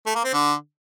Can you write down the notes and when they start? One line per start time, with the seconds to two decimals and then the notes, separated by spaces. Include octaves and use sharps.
0.06 A3
0.15 A#3
0.24 C4
0.33 D3